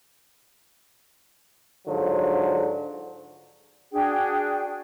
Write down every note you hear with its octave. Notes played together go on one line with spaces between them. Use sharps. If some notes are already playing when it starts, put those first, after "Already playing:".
G#2 D3 F3 F#3
D4 F#4 G#4 G5